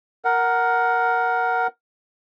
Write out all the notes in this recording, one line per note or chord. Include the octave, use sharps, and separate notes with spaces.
A#4 F#5